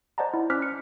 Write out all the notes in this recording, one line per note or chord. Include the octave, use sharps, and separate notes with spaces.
C5 D5 D#5 F#5 A5 A#5
E4
C#4 C5 D6 F6 F#6 B6
C#7